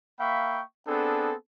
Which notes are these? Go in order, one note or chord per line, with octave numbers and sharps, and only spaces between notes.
A#3 E5 F5 G5 B5 C#6
B3 C4 D4 G#4 A4